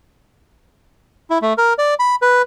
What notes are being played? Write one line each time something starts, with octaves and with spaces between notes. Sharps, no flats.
E4
A3
A#4
D5
B5
B4